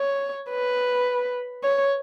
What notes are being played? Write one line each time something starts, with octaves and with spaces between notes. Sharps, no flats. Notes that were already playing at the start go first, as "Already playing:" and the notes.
Already playing: C#5
B4
C#5